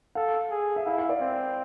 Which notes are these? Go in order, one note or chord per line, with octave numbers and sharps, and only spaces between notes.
A4 F5
G#4
E5
E4 F5
F5
D5
C4